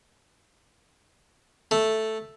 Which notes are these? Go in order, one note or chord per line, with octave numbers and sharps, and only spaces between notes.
A3